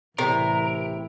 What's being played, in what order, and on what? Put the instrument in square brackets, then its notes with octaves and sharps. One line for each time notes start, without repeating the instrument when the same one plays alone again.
[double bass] A1 E4 [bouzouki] C3 [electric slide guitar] A#4